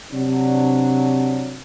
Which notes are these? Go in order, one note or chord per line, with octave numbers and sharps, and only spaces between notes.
C3 F#3 D4